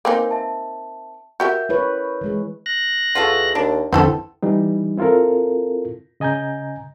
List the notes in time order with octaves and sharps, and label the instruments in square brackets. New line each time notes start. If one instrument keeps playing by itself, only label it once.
[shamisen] A#3 C4 D#4 [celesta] A#4 B4 G#5
[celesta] E5 A5
[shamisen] F#4 G4 E5 [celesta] A#4 G6
[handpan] E4 B4 C#5
E3 G#3 G#4
[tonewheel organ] F#6 A#6
[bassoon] E2 [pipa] F4 F#4 A4
[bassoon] D#2 [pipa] D4
[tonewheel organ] F2 D3 [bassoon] B3 [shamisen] C4 E4 A4
[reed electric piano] E3 G3 D#4
C4 E4 F4 A4 A#4
C#3 D#5 G#5 A#5 G6